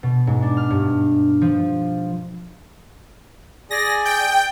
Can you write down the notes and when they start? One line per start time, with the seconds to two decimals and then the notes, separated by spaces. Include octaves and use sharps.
0.03 B2
0.27 G#2
0.42 D4
0.57 F6
0.70 G2
1.42 F3
3.71 G#4 D5 G#5 A#6
4.05 G5